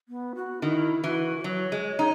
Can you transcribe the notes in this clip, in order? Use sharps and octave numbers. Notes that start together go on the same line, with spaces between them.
B3
F#4
D#3 E4
E3 F#4
B4
F#3 C#5
G#3
D#4